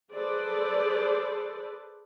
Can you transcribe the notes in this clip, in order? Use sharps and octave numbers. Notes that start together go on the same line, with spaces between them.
G#4 A4 B4 C5 D5